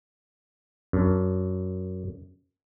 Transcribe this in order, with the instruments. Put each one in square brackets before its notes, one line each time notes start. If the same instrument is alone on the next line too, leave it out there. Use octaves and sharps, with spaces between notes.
[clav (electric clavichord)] F#2 D4